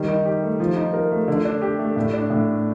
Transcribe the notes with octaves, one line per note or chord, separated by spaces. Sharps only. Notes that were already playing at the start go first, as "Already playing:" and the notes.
Already playing: D#3 G3
D#4
G4
A3
F3
D#4
A#4
A3
D3
D4
G4
A3
A2
D4
A2
A3